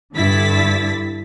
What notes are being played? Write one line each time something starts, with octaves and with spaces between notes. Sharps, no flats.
G2 D3 E4 A6 B6